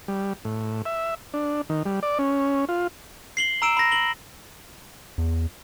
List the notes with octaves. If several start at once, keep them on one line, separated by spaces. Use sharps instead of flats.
G3
A2
E5
D4
D#3
G3
D5
C#4
F4
C7 F#7 G7
A#5 E6 D7 E7
B5 A#6
F#7 G7
E2